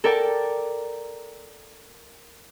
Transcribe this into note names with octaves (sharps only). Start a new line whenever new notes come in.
A4 A#4 D5 G5 A5